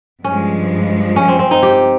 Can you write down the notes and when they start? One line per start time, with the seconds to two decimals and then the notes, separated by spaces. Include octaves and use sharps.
0.24 G2 F3 G#3 C#4
1.16 C#4
1.28 C4
1.39 C4
1.51 D#4
1.63 G4